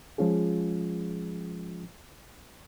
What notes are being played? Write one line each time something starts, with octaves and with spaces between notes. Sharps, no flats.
F3 G#3 C#4 F4 G#4